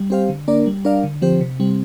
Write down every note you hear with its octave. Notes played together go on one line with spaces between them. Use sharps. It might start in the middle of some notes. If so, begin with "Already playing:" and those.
Already playing: G3
C4 G4 C5 F5
D3
A#3 D4 A#4 D5
G3
D4 A#4 D5 F5
D3
F3 C4 G4 C5
C3
G3 C4